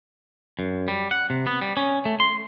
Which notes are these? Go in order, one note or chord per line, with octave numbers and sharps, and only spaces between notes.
F#2
G3
F#5
C3
B3
G3
C#4
A3
C6